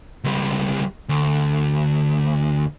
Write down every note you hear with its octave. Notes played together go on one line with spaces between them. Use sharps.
C#2 G3
D2